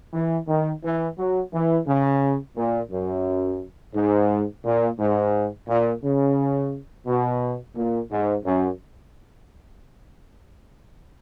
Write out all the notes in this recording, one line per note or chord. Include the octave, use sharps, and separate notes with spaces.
E3
D#3
E3
F#3
E3
C#3
A#2
F#2
G#2
A#2
G#2
A#2
C#3
B2
A#2
G#2
F#2